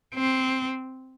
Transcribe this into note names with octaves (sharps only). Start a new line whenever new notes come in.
C4